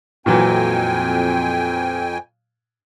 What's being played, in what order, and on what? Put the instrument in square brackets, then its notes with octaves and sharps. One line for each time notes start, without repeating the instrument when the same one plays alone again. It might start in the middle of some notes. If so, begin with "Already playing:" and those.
[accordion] F2 G5 G#5 [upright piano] A#2 E3 F#3